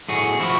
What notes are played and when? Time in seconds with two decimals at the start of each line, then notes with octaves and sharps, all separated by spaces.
0.09 A2 F#4 G#4
0.40 F3 E4 F#4